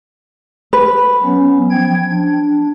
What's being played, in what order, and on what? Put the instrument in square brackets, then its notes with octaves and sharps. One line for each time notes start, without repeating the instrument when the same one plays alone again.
[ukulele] B4
[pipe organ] F#3 B3 C#4
F3 G5 G#6
D4